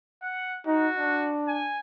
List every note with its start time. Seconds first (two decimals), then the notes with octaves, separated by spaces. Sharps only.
0.22 F#5
0.67 D#4 F#4
0.98 D4
1.48 G#5